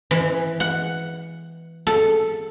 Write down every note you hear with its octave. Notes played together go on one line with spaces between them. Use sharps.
E3
F#5
A4